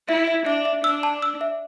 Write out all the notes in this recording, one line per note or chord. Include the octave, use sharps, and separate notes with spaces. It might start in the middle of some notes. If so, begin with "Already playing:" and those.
E4 E5
E5
D4 E5
E5
D4 E6
A5
E6
E5